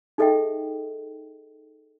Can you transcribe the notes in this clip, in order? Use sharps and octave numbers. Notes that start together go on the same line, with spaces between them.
D#4 G#4 A4 D#5 E5 G5